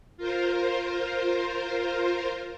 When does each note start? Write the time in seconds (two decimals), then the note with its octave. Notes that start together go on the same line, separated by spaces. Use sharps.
0.17 F4 A#4 C5